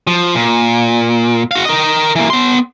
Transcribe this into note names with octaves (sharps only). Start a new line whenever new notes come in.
F3
A#2
F#4 F5
A#4 D#5
E3 A#3
B3 C6